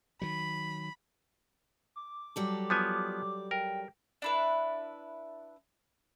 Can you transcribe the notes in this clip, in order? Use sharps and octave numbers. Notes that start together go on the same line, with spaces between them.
D#3 F#3 B5
D6
F#3 G3 A4
F3 B3 G#5
A#4 G5
D4 E4 B4